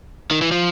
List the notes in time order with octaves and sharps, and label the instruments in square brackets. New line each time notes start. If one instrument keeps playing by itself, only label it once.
[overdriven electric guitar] D#3
E3
F3